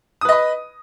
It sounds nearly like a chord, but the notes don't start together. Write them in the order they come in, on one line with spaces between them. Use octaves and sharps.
D#6 B4 D#5 B5